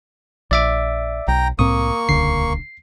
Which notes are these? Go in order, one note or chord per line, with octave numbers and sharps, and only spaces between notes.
A#1 D5 E5 D6
B1 G5 A#5
C2 A2 A#3 C4 C#6 D#6
D#1 C#2 D3 C7